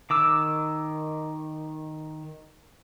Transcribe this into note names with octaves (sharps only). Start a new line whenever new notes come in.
D#3 D6 E6